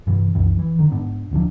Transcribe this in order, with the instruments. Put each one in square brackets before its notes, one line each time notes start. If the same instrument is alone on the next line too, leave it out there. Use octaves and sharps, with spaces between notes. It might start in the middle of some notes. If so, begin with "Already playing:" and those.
[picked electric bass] G2 C3 E3
C2 F#2 E3
E3
D3 D#3
G#2 B3 D4
D1 D3 F3 D4